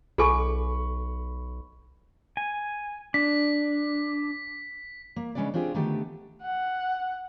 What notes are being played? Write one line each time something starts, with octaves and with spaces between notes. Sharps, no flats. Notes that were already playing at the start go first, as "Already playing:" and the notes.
B1 G#4 A4 G#5 B5 C#6
G#5
D4 B6
A#3
C#3 G#3 C#4 D4 B4 D5
C4 D4 F4 G4 G#4
D3 D#3 A3 B3 G4
F#5